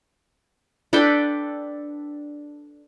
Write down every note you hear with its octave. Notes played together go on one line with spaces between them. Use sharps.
D4 A4 B4 G5